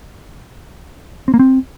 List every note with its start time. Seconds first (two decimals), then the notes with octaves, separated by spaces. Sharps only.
1.28 C4
1.34 A#3
1.39 C4